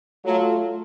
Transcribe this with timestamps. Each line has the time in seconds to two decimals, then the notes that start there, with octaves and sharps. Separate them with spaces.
0.25 F#3 A3 F4 A4